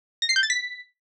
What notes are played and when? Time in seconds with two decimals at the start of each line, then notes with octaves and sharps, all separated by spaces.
0.22 A#6
0.29 C7
0.36 G6
0.43 A6
0.50 B6